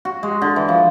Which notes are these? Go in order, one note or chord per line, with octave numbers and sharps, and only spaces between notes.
F#4
G#3
D3
E3
F3